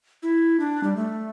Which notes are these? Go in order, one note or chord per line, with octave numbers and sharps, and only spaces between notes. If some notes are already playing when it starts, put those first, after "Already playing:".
E4
D4
G3
A3